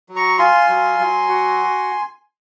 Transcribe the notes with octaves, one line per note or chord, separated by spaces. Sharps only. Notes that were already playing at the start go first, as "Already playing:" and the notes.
F#3
A#5 C#6
F4 G#5 C6
F#3
F#3
F#4